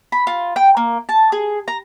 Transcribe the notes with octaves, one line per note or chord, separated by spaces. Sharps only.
B5
F4
G5
A#3
A5
G#4
A#5